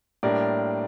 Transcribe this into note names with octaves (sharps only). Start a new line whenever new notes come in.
A2 G3 A#3 D4 A#4 D5